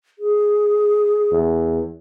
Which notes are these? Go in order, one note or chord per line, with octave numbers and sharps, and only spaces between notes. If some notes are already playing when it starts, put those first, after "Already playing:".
G#4
E2